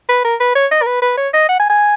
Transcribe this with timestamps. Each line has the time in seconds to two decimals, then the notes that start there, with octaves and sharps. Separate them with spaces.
0.09 B4
0.25 A#4
0.40 B4
0.56 C#5
0.72 D#5
0.82 A#4
0.87 B4
1.02 B4
1.18 C#5
1.34 D#5
1.49 F#5
1.59 G#5
1.70 G#5